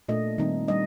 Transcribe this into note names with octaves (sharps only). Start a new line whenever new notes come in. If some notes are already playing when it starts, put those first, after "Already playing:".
A#2 A3 D4 D#5
D#3 G3 C4 D#4
G3 D4 D#5